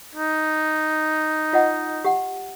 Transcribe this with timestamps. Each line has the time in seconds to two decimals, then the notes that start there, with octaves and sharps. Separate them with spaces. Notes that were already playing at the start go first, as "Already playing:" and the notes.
0.15 D#4
1.53 F4 D#5 F#5
2.05 G4 F#5